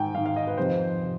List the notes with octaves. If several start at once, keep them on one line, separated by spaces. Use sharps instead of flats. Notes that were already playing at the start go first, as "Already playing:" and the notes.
Already playing: G#2 D#3 G5 G#5
G#2 D#3 F5
F5
D#5
B4
F2 C3 D#3 C5
C3